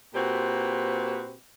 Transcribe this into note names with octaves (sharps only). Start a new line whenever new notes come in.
A#2 C4 F#4 G4 B4